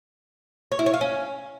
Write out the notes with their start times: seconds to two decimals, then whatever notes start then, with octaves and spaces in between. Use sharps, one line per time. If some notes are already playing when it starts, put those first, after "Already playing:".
0.72 C#5
0.79 E4
0.86 C#5
0.94 F5
1.01 C#4